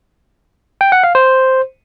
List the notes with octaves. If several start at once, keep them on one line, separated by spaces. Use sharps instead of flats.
G5
F#5
F5
C5